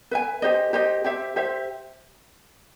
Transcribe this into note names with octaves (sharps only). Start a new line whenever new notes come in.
B4 E5 G#5
G4 C5 D#5
G4 C5 D#5
G4 C5 E5
G4 C5 E5